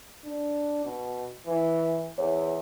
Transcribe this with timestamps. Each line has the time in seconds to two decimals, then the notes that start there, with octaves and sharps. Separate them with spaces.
0.25 D4
0.85 B2
1.47 E3
2.18 E2 C#5